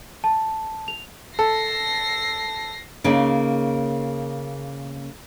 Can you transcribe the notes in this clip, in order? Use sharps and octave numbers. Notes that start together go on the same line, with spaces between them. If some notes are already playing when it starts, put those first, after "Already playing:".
A5
F7
A4 A#6 C7
C#3 A#3 C#4 D#4